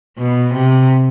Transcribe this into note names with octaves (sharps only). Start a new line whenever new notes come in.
B2
C3